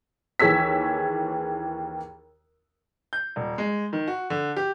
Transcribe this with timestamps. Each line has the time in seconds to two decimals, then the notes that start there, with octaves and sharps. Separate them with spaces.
0.40 D#2 E3 G#4 C#5 E6 B6
3.13 G6
3.36 D#1
3.58 G#3
3.93 D#3
4.08 F#4
4.30 D3
4.57 G4